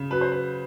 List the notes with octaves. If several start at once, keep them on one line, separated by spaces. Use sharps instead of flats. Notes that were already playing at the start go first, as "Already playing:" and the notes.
Already playing: C#3
F#3 B4
C5
B4